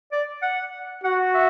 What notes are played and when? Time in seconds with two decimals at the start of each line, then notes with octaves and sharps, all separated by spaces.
0.12 D5
0.42 F#5
1.04 F#4 F#5
1.34 E5